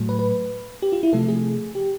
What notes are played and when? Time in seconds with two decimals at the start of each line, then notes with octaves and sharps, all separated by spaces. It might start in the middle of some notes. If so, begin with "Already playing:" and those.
Already playing: A2 F#3 A3
0.09 B4
0.19 B4
0.82 G4
0.92 F4
1.03 E4
1.13 C3 F3 A3 A4
1.28 G#4
1.75 G4